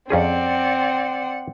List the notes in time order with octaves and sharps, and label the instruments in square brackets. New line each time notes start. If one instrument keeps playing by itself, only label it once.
[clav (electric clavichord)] F2 C#4 G#4 [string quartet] C4 [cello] D5 F#5